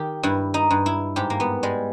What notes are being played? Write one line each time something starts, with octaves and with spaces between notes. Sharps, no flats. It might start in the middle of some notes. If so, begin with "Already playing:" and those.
Already playing: D#3 G4
G2 E4
D#4
G2
E4
G#2 G4
A#3
B3
G3 G#3